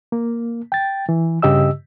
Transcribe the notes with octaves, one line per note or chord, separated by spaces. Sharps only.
A#3
G5 A6
E3
G2 C#3 G4 D#5 E6